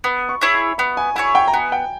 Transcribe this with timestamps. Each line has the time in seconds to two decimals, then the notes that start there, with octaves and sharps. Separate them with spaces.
0.04 B3 B5
0.29 C#6
0.41 E4 G#4 C#5
0.54 B5
0.78 B3 B5
0.97 G#5
1.16 E4 G#4 C#5 G#5
1.35 G5
1.48 A#5
1.53 B3 G#5
1.72 G5